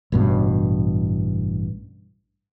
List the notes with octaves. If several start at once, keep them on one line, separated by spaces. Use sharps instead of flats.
A1 G2 B2